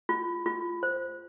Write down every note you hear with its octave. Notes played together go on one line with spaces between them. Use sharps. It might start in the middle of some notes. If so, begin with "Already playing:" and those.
F4
F4
C5